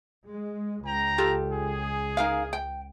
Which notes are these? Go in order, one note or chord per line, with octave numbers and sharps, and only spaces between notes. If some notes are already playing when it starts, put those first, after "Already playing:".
G#3
C#2 G5 A#5
F4 G4 A4
G#4
D#4 A#4 F5
G5